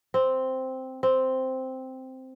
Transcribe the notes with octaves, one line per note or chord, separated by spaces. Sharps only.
C4
C4